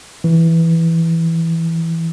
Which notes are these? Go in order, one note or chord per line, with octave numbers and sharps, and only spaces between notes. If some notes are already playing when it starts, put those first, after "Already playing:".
E3